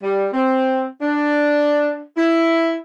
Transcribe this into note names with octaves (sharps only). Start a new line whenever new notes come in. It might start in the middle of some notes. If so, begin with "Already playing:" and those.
G3
C4
D4
E4